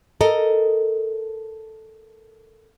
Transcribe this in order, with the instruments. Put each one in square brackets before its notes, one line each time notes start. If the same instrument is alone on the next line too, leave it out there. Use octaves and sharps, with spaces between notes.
[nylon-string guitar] A4 A#4 D#5